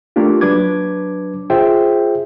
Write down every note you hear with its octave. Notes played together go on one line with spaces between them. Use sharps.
A3 A#3 D4 F4 G4
F#3 D4 B4 D6 G#6
F4 G#4 C5 E5 G5